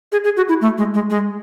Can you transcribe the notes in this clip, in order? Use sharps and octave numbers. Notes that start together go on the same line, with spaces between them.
G#4
G#4
F#4
E4
A3
G#3
G#3
G#3